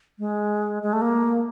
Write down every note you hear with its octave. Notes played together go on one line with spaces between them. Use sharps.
G#3
G#3
A3
A#3